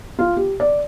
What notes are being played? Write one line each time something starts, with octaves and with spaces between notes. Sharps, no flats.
F4
G4
D5